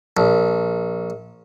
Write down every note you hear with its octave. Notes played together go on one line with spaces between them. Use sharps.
A#1